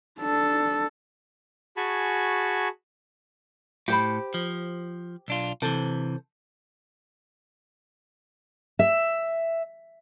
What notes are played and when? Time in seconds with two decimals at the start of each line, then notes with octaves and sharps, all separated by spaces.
0.20 D4 A4
1.77 F#4 G#4 G#5 A5 B5 C#6
3.88 A2 G4 C5 B5
4.34 F3
5.28 B1 D4 F4
5.62 C3 E3 A4 C5
8.79 E5